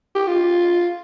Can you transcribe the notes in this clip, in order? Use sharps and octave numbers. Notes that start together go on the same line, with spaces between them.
G4
F4